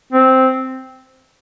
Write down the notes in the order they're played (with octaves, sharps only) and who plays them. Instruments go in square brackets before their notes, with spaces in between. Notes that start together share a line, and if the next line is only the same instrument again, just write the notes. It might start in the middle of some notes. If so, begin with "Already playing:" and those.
[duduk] C4